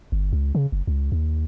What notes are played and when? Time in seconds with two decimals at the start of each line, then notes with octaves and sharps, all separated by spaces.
0.12 G1
0.33 C#2
0.55 C#3
0.72 F#1
0.87 C#2
1.12 D#2